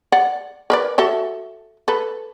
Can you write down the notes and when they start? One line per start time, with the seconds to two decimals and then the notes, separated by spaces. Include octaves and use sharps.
0.12 D5 F#5
0.70 A#4 B4 D5
0.98 F#4 A4 E5
1.88 A4 B4